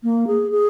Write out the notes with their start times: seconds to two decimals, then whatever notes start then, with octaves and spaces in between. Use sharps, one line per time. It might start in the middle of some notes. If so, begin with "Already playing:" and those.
0.03 A#3
0.27 G#4
0.51 G#4